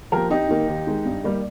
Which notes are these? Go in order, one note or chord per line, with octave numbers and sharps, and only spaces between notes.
F3 A#3 G4 A#4
F2 D#4 G4
D#3 A#3
D#2
D#3 G#3
G2
G3 A#3